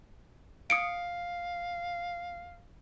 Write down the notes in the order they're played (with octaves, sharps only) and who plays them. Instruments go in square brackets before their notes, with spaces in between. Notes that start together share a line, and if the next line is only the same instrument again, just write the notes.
[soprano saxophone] F5 [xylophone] D#6 C#7 D7